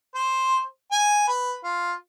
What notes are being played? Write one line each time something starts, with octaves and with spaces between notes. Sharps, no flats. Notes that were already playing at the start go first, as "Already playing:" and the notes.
C5
G#5
B4
F4